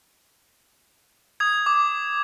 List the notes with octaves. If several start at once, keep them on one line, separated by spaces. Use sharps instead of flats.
D#6 G#6
D6